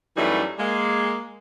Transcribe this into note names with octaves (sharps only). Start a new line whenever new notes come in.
F#2 E3 F#3 G3 A3 D#4
G#3 A#3